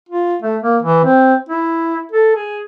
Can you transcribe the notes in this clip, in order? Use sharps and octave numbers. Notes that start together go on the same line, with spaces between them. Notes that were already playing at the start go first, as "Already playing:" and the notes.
F4
A3
A#3
E3
C4
E4
A4
G#4